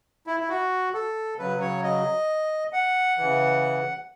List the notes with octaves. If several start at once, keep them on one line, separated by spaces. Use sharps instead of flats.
E4
E4
F#4
A4
C#3 F#3 B4
C#5
D#5
F#5
C#3 E3